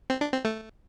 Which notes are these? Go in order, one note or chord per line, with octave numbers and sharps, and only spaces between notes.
C4
D4
C4
A3